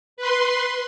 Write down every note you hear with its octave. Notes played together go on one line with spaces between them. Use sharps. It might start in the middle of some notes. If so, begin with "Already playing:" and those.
B4 C6